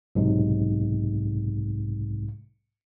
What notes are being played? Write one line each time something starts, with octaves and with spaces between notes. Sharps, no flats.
B1 G#2 C3